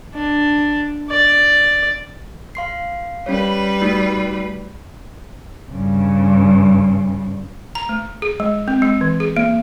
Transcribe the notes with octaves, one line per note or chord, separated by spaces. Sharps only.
D4
D5
F5 C6 C7
G3 C#4 B4 C#5
A3 D#4 F#4
G2 C#3
A#5
A3
G#4
G#3
C4
G#3
E3
G#4
A#3